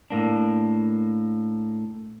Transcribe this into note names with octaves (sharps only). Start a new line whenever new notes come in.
A2 A#3 D4